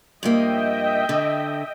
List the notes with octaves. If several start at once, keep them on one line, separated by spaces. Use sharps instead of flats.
G2 F3 A#3 D#5 E5 G5
D3